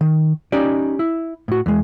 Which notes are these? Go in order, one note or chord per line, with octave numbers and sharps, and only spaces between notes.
D#3
C#4 D#4 G4 D5
E4
A2 F#4
E2 G#3